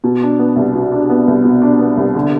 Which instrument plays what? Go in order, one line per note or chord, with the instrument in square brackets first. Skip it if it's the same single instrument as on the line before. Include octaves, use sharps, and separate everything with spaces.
[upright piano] B2
D4
B3
C2
B2
D4
B3
C2
B2
D4
B3
C2
D3